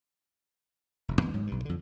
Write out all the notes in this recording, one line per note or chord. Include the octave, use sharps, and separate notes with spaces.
F1 E2
D#2 E3 G#3 B3
G#2 F#3
B1 G2
F2 D3